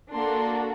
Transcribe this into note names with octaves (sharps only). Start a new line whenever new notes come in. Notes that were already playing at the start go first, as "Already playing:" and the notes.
A#3 D4 F#4 A4 C6